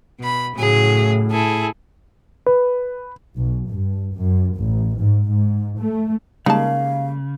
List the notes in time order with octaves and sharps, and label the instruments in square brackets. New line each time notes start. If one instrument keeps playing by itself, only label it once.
[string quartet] B2 B5
[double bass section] A2 [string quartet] C#3 F#3 G#4
[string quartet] E4 G#4 A4
[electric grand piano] B4
[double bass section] B1
G2
F#2
A1
G#2
G#2
A3
[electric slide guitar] C#3 [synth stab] G3 G#3 A#3 [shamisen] D#4 A5 [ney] F5